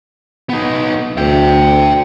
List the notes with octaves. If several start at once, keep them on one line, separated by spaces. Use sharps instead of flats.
B3 D#4
D2 E5 G5